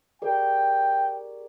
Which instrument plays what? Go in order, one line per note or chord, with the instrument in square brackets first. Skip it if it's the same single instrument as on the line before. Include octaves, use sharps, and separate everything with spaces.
[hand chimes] G4 A#4 D5 [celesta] G#4 [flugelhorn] G5